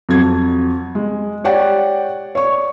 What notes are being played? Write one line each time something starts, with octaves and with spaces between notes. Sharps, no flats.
F2 F#3 G#6
G#3
G4 C#5 D5 F#5 G5
C#5 D5 C#6